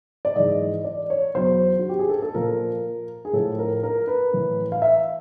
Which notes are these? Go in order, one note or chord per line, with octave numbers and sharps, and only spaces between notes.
D5
G#2 E3 D#5
D5
C#5
E2 B2 F#3 C5
F#4
G4
G#4
A4
A4
A#2 F3 A#4
G#4
A2 F3 A4
A#4
A#4
B4
A2 E3
F5
E5